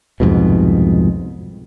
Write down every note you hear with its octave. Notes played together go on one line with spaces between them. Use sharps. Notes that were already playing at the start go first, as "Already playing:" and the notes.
C2 F2 G#2 B2